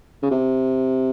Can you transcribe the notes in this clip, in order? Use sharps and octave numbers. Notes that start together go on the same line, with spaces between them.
C#3
C3